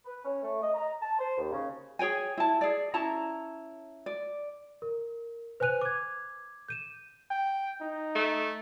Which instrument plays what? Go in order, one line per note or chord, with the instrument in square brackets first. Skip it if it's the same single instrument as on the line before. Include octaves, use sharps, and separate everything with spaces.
[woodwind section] B4
C#4
A3
D#5
A#5
A5
C5
D#2
C#3
[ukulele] G#4 C#5 G5 G#5
E4 A5
G#4 D5
C#4 E4 A5 A#5
D5
[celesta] A#4
B4 C5 G#5 F#6 D#7 F7
D6 G#6
G6 D#7 E7
[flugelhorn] G5
D#4
[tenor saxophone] A3